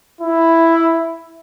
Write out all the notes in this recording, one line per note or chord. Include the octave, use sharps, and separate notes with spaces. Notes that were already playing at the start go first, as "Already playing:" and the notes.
E4